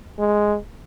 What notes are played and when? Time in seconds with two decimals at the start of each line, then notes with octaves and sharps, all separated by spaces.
0.19 G#3